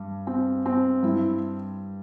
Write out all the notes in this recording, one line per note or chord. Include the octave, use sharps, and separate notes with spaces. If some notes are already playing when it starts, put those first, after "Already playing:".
Already playing: G2
C4
C4
G2 E4